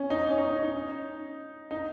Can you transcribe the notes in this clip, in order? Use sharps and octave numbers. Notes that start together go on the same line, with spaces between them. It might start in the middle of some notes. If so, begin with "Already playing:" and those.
Already playing: C#4
D#4
C#4
D#4
D#4
D#4
D#4